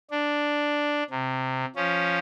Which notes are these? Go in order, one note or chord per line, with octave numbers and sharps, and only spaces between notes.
D4
C3
F3 C#4